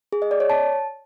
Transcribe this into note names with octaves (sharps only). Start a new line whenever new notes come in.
G#4
D#5
D5
C#5
A5